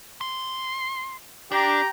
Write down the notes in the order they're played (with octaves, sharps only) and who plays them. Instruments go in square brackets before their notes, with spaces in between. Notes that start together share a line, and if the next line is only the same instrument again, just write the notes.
[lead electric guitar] C6
[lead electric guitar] D4 [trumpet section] G4 G5 A#5